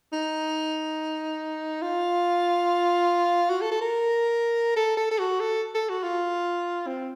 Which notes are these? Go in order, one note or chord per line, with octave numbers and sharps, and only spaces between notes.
D#4
F4
F#4
A4
A4
A#4
A4
A4
A4
F#4
A4
A4
F#4
F4
C4